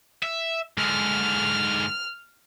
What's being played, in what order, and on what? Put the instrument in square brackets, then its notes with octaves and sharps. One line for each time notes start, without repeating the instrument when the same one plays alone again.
[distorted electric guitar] E5
[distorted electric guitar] G#2 D3 [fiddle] F6